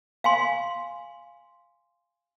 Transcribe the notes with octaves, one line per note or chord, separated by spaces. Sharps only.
F5 G#5 C6